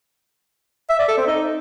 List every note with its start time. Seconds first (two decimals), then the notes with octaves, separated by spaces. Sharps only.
0.90 E5
0.99 D5
1.08 A4
1.18 C4
1.27 D#4